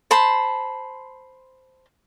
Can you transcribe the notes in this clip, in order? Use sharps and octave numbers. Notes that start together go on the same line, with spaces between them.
C5 A5 B5 C6